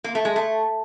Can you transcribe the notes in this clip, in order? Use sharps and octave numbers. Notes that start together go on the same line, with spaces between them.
A#3
A3
G#3
A3